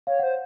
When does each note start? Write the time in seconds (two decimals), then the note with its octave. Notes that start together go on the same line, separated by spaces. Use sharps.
0.07 C#5 F5
0.19 C5 F#5